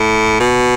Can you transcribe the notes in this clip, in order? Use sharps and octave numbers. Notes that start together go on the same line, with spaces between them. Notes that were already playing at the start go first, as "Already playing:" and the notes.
Already playing: A2
B2